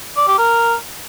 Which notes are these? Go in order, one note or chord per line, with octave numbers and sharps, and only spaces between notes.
D5
G4
A#4